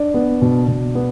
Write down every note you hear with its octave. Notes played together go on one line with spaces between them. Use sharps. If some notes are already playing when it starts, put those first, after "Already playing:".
Already playing: D4 D5
B3
B2
B2
B3